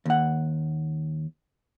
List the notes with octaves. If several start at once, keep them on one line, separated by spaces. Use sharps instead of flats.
D#2 F#5